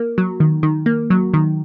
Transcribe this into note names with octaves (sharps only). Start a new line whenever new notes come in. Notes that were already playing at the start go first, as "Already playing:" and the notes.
Already playing: A#3
F#3
D#3
D#3
A#3
F#3
D#3